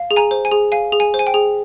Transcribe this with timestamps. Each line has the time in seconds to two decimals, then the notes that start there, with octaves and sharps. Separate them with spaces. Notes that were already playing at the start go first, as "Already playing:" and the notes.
Already playing: F5
0.11 G#4
0.16 G#5 A#5
0.31 C5
0.45 G#5
0.52 G#4
0.72 F5 G#5
0.92 G#4
1.00 G#5
1.14 C5
1.19 G#5
1.27 G5
1.34 G#4